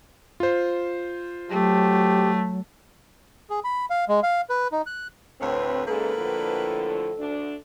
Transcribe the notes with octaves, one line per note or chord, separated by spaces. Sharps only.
F4 C5
F#3 A3 G4
G#4
B5
F5
G#3
F5
B4
D#4
F#6
D2 A2 C4 B4 C#5
G#2 C#3 A#3 A4 B4
A2 D3 F3
D2 D4